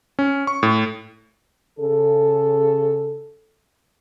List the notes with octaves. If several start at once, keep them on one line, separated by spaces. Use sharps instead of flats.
C#4
C#6
A2
C#3 A4